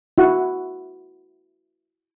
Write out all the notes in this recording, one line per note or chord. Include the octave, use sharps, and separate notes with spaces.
E4 F#4 F#5